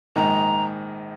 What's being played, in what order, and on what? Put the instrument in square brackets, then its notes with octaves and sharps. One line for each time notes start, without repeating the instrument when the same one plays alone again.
[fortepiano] A#1 G#2 D#3 [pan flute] A#5